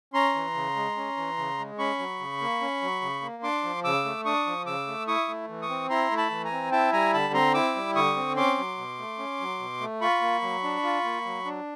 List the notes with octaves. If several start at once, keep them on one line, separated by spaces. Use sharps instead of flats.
C#4 A#5 C6
E3
C#3
G#3
C#4
E3
C#3
G#3
C#4 B5 C#6
F#3
C#3
A#3
C#4
F#3
C#3
A#3
D4 C6 D6
F3
C#3 D6 E6
A3
D4 C#6 D#6
F3
C#3 D6 E6
A3
E4 C#6 D#6
A3
E3
C#6 D#6
C4
E4 A#5 C6
A3
A5 B5
E3
G#5 A#5
C4
E4 G5 A5
G3 G#5 A#5
D3 A5 B5
C4 A#5 C6
E4 D6 E6
G3
D3 C#6 D#6
C4
C#4 C6 D6
F#3
B2
A3
C#4
F#3
B2
A3
F4 B5 C#6
A#3
F#3
D4
F4
A#3
F#3
D4